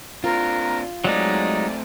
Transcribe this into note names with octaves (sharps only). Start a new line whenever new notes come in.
C4 D4 F4 A#4
F#3 G#3 A3 C4 D#4 D5